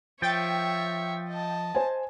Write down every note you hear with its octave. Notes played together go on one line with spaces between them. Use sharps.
F3 C#5 E5 G5 A6
D#5 A5
C5 G#5